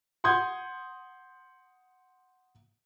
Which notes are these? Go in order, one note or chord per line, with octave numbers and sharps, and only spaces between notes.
F#5 C6 D#6 G6 G#6